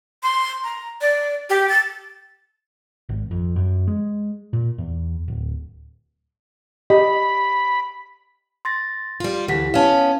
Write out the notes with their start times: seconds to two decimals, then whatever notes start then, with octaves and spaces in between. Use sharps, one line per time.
0.23 C6
0.64 A#5
1.01 D5
1.50 G4
1.69 A6
3.09 G#1
3.31 F2
3.56 F#2
3.88 G#3
4.53 A#2
4.78 E2
5.28 D1
6.90 G4 D#5 B5
8.65 C6 A6 A#6
9.20 G3 F4
9.48 D2 E3 G4 F#5 B6
9.74 B3 C#4 F5 A5